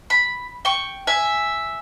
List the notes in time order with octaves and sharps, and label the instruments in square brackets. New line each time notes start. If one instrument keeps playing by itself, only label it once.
[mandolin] B5
G5 C#6
E5 G#5